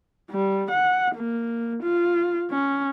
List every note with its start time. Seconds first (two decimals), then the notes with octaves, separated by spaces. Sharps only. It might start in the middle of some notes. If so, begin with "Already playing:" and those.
0.31 G3
0.70 F#5
1.15 A#3
1.83 F4
2.51 C#4